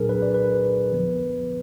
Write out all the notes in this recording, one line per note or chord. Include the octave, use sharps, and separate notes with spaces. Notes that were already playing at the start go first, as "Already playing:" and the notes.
Already playing: A#2 F#3 D4 G#4 A#4
B4
D5
B4
D3 F3 B3